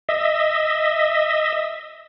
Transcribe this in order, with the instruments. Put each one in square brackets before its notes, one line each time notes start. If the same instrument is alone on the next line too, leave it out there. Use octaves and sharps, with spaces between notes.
[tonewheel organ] D#5 E5